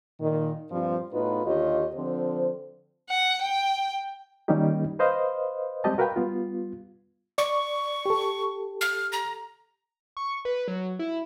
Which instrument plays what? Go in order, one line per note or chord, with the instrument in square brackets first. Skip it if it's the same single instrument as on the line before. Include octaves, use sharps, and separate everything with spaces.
[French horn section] A#2 D#3
G2 A#2 F3 G3 C4 F4
A2 B3 D#4 F4 F#4 B4
D#2 D3 F4 G4 C#5 D#5
D3 F3 C4 C5
[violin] F#5
G5
[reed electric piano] D#3 G3 A#3 C#4 D#4 G4
B4 C5 D#5 F5
G3 G#3 C4 G4 D#5 A5
F#4 A#4 B4 F5 G5
G3 B3 F4
[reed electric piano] D5 [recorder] C#6
[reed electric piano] G4 A4
[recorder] F6
A#5
[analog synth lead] C#6
B4
F#3
E4